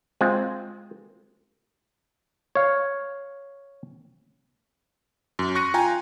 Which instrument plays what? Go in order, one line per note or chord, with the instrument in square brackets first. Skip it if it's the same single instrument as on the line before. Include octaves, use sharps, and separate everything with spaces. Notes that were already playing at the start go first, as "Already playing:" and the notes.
[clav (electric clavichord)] G#3 C4 F4
C#5 F5
[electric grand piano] F#2
C#6 F#6 A#6 C#7 D#7
F4 F5 G5 G#5 A#5